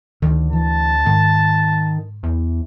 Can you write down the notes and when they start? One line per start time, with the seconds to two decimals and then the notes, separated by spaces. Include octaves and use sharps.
0.22 D2 D#3
0.53 E3 A5
1.06 G#2 D#3
2.23 E2